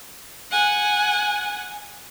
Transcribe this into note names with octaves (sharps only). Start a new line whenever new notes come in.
F#5 G#5